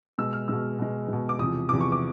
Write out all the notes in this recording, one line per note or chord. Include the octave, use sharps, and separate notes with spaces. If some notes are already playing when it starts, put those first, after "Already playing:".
B2 G#3 E6
F6
B2 G#3 E6
B2 G#3
B2 G#3
D6
E2 C3 F3 D#6
E2 C3 F3 D6
C#6
D6